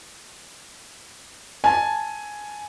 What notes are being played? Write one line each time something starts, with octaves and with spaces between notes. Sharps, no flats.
G#5 A5